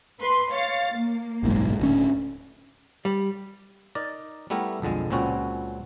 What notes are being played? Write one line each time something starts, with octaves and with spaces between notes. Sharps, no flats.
B4 C6
C#5 F5 A6
A#3
F#1 B1 G#2
D1 D2 C#4
G3
D#4 A#4 D5
G3 A3 B3 E4 G4 A#4
B1 F2 D3 G#3
C#2 A#2 C4 C#4 F#4 B4